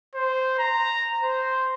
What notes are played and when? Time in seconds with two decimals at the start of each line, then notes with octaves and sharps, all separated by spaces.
0.14 C5
0.59 A#5
1.22 C5